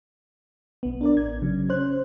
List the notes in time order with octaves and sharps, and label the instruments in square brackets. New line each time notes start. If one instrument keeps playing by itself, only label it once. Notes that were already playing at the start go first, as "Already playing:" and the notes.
[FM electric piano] B1 B3
D4 A#4 D5
A1 G#6
C#3 F#3
C#4 C5 F#6